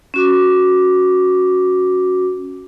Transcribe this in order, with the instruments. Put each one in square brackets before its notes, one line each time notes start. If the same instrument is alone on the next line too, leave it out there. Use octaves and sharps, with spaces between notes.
[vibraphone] C#4 F#4 D6